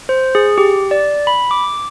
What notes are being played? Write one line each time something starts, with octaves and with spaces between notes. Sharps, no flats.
C5
G#4
G4
D5
B5
D6